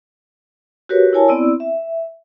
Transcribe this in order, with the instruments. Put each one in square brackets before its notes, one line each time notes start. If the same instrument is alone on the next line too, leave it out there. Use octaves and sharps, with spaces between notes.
[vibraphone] F#4 G4 A#4 B4 C#5
E4 A#4 C#5 G#5 A5
B3 C4 E4 D5 E6
E5